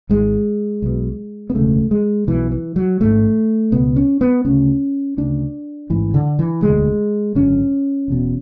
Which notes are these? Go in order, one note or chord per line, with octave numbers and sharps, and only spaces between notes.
G#1 G#2 G#3
B1 B2
B3
E1 D2 C#3 A3
G#3
B1 B2 E3
E3
F#3
A1 G#2 A3
C#2 B2 B3
C#4
B3
D2 C#3 C#4
D2 C#3 D4
A1 G#2 E3
D3
E3
E1 D2 D3 G#3
G#1 F#2 D3 C#4
E1 E2 B2